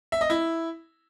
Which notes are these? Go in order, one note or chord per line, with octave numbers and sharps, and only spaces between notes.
E5
D#5
E4